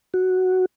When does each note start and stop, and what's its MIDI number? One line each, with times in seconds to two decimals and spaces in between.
0.14 0.65 66